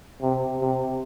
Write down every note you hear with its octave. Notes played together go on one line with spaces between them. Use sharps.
C3
C3